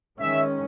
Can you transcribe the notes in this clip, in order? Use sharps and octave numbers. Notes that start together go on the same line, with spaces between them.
D#3 G#3 C#4 E5